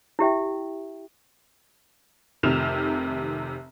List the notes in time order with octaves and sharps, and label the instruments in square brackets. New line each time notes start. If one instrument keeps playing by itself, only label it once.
[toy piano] E4 G4 E5 G5
[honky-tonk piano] F1 C3 D#3 F6 E7 F7